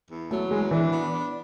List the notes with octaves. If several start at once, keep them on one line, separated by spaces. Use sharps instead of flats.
E2
F#3 A3
E2 G#3
E3 D4
B3
D4